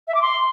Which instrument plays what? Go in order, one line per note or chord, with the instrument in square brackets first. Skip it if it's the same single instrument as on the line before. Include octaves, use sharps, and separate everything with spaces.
[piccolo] E5
D6
C6